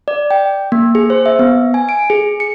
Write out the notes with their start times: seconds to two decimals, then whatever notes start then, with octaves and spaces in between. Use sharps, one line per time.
0.08 D5
0.31 G5
0.72 A#3
0.95 G#4
1.10 C5
1.26 E5
1.39 B3
1.74 G#5
1.89 D7
2.10 G#4
2.40 C#7